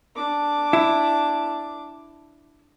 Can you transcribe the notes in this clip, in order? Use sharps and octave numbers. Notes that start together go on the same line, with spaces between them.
D4 D6
E4